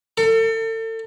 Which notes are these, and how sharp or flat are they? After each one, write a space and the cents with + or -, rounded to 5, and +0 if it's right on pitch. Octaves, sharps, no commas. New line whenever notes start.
A4 +35